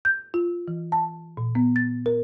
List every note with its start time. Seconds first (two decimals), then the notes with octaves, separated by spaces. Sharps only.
0.05 G6
0.34 F4
0.68 E3
0.92 A5
1.37 A#2
1.55 B3
1.76 A6
2.06 A#4